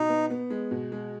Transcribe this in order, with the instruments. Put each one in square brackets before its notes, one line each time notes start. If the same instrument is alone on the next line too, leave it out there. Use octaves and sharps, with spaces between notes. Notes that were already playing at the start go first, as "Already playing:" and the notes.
Already playing: [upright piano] B2 [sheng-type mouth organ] D#4
[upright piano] B3
B3
G#3
B2
G#3